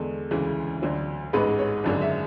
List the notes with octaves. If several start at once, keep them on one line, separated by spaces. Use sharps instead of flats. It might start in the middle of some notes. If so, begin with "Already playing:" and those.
Already playing: E2 D3 G#3 A4
D2 C#3 E3 G#3
D2 D3 F#3
A1 G#2 G#3 B4
C#5
G#1 F#2 D3 G#3
E5